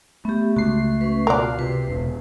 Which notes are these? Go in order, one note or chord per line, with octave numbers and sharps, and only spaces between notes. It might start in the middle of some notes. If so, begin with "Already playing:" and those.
A3 B3 G4
C#2 F#4 C7
C#4 B4
B2 F4 F#4 A#4 D5 F5
C3 B4
E1 B2